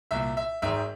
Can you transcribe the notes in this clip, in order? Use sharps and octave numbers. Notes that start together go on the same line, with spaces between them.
C2 A#2 E5
E5
G#1 G#2 D#3 E5